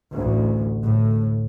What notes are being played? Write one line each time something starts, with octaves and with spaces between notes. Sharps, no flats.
A1 D2
A2